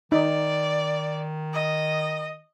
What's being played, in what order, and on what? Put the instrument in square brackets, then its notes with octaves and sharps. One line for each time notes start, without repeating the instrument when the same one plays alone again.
[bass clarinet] D#3 [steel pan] D#4 [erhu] D5
[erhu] D#5